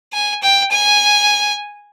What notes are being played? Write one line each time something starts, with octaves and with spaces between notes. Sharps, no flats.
G#5
G5
G#5